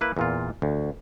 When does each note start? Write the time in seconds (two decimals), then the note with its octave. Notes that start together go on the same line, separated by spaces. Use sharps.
0.01 A#3 E4 B4
0.17 E2 A#2 F4
0.62 D2